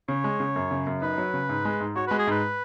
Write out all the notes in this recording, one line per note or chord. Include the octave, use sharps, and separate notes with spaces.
C#3 C#5
G#3
C#3
F#2
C#3
F#2
D#4 B4
F#3
C#3
G#2
G#3
G#2
F#4 C#5
G#3 B4
G#4
G#2 B4